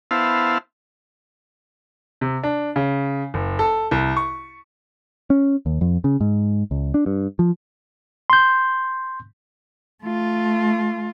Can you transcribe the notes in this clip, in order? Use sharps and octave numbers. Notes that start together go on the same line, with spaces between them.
B3 E4 C5 F5 A5
C3
D4
C#3
F#1
A4
C2
C#6
C#4
D#2
F2
C#3
G#2
C#2
D4
G2
F3
C6 G6
A3 F4